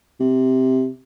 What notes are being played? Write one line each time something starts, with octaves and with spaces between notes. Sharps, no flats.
C3